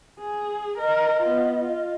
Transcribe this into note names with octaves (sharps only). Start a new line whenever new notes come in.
G#4
A#4 D#5
B3 F4
F4